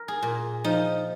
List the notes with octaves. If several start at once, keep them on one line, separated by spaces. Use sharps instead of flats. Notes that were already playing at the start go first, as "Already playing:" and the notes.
Already playing: A#4
G#4
A#2
F3 D#4